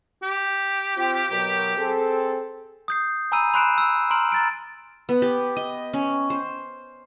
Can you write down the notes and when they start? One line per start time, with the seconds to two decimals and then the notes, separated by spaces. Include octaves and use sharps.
0.23 G4
0.97 C4 F4 G5
1.31 B2 F#3 A#4
1.77 C4 G#4 A4
2.88 D#6 G6 C7
3.32 G#5 A#5 B5 E6 D#7
3.54 B5 C6 F#6 C7 D7 E7
3.78 E6
4.11 A#5 C6 F6 D7 F#7
4.32 A#5 A6 D7
5.09 B3
5.22 G4
5.56 D#5
5.93 C#4
6.30 C5